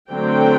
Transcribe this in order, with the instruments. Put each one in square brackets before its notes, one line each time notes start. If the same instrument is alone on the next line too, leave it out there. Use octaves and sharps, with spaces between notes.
[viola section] D3 F#3 A3 C4 G5